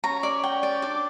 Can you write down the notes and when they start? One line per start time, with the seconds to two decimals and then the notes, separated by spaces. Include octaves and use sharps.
0.04 C#4 A#5
0.23 D5
0.44 G5
0.63 D5
0.82 D4 D5